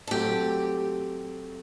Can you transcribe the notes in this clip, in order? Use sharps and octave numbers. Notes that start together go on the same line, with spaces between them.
A4
F#3 A3 C4 G4